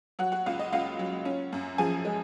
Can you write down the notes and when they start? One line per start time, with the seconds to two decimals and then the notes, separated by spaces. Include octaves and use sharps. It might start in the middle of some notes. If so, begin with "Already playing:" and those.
0.19 F#3 F#4 F#5
0.32 F#4 F#5
0.46 C#2 F4 F5
0.59 D#5
0.72 C#2 F4 F5
0.99 F#3
1.25 C#4
1.53 F#2
1.78 F3 G#4 G#5
2.05 G#3